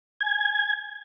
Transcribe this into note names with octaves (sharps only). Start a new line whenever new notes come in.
G#5 G#6